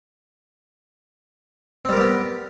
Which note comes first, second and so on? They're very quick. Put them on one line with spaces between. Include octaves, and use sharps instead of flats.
C4 G3 A#4 G4 B3